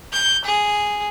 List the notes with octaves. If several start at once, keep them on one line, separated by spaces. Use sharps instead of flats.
G6
G#4